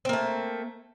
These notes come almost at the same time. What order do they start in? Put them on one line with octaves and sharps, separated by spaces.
C4 A#3 A3